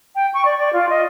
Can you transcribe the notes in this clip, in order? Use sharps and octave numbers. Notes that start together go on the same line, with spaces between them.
G5
C#6
D5
D5
F4
D#5